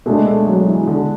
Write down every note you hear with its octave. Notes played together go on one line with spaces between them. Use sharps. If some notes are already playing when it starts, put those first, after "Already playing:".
B2 G#3 A3 D4
A3
F#3
E3
E3
D3